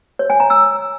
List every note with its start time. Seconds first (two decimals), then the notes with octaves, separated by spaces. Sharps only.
0.19 C#5
0.30 G#5
0.40 A#5
0.50 E6